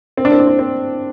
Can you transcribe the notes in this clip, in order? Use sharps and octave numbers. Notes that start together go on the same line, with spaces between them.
C4
D4
C4
D4
C4
C4